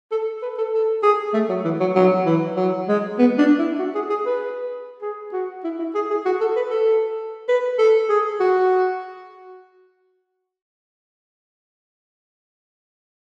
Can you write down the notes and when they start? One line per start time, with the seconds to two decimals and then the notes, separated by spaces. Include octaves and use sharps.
0.12 A4
0.42 B4
0.58 A4
0.73 A4
1.03 G#4
1.34 A3
1.49 F#3
1.65 E3
1.80 F#3
1.95 F#3
2.26 E3
2.56 F#3
2.88 G#3
3.19 B3
3.38 D4
3.59 E4
3.79 F#4
3.95 G#4
4.10 G#4
4.26 B4
5.02 G#4
5.33 F#4
5.64 E4
5.79 E4
5.95 G#4
6.10 G#4
6.26 F#4
6.40 A4
6.56 B4
6.71 A4
7.48 B4
7.79 A4
8.09 G#4
8.40 F#4